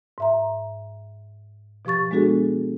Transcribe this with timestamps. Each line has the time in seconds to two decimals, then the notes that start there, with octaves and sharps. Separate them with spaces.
0.18 G#2 E5 A#5
1.85 B2 F3 G4 C#6 A6
2.11 G#3 B3 D4 F#4 G#4 A4